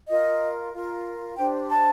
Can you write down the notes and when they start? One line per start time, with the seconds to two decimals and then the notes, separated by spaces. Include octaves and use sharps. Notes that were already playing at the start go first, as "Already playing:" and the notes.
0.09 F4 A#4 D#5
0.73 F4 A#4
1.37 D4 G4 C5 G5
1.70 A5